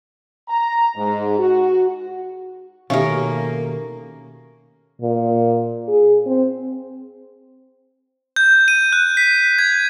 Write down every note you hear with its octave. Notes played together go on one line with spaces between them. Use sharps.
A#5
G#2
F#4
B2 D#3 A3 C#4 G4 A#4 E5 F5
A#3
A#2
G#4
C4
G6
D#7
F#6
B6
G#6